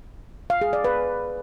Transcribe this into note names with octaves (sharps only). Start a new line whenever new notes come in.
F5
G#4
D5
B4